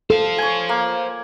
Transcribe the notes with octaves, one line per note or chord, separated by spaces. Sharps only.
A4 C5 F5
C#5 G#5
A#3